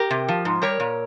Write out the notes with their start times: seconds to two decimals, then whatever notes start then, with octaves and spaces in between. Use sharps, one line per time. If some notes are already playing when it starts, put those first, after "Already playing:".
Already playing: G4 A#4
0.11 C3
0.28 F3
0.45 G#2
0.62 G3 A#4 C#5
0.80 A#2